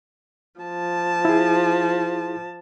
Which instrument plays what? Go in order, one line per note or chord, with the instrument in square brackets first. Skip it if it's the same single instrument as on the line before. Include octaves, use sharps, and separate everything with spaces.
[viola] F3 A5
[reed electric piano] E4 G#4